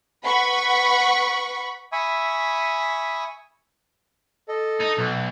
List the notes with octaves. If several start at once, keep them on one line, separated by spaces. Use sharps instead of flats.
B4 F#5 B5 C#6
E5 G#5 B5 C#6 D#6
A4 D#5
D#4
B1